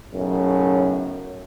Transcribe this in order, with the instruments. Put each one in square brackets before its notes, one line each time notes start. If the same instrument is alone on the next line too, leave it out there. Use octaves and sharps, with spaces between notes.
[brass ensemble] B1 F#2 A2 C#3